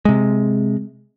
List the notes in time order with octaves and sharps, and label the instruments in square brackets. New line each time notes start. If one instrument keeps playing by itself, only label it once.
[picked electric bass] C3 G#3